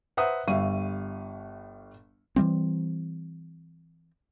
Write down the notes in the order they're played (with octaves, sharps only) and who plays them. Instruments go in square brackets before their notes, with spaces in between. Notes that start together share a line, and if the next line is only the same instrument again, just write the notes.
[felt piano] B4 C5 E5 F#5 A#5 D#6
G1 G3 E5 F5 C#6 D#7
[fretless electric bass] E3 F3 G3 C4